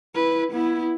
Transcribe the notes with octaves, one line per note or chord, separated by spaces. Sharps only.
E4 B4
B3 E4